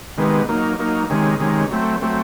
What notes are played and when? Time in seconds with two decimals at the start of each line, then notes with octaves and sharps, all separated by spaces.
0.17 C3 D#3 G#3 B3
0.48 F#3 A#3 D#4
0.79 F#3 A#3 D#4
1.10 C3 D#3 G#3 C#4
1.40 C3 D#3 G#3 C#4
1.71 F#3 A3 C4
2.01 F#3 A3 C4